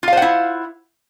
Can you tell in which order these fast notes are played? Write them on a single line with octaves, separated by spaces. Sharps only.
F4 F5 C5 F#5 E4